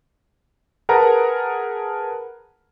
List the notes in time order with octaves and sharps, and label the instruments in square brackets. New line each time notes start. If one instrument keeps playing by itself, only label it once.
[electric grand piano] G#4 A#4 B4 F#5 A5 A#5